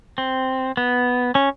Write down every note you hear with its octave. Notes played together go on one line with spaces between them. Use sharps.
C4
B3
C#4